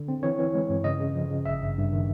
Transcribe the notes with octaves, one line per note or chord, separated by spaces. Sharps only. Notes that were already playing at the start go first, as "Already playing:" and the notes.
Already playing: D3
C4
E3 C#5
E3
G#3
G2
C#3 D#5
C#3
F3
C#3
G#1 E5
G2
G2
D#3